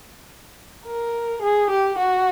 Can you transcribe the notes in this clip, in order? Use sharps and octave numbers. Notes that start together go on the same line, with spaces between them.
A#4
G#4
G4
F#4